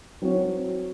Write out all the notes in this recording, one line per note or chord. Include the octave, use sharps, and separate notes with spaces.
F#3 C4 F#4 C#5